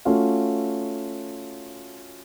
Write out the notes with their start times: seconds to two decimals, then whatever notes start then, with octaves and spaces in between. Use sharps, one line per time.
0.05 A3 C#4 F4 F#4 F5